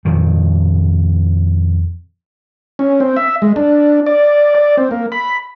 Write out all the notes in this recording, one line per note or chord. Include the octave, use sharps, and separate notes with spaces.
F2 A#2 D#3
C#4
C4
E5
G#3
D4
D5
D5
C4
A#3
B5